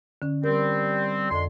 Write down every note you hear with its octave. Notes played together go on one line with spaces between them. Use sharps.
D3 C#4
G3 C4 A#4
F2 D3 G#3 C6